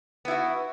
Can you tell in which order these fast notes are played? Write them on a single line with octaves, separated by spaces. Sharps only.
B3 E4 F#4